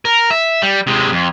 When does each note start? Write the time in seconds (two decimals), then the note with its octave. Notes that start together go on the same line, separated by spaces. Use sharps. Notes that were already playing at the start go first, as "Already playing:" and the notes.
0.05 A#4
0.30 E5
0.62 G3
0.87 C3 G#3
1.12 F2